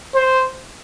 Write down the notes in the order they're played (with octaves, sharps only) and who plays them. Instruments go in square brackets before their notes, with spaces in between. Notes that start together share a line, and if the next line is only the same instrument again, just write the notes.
[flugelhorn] C5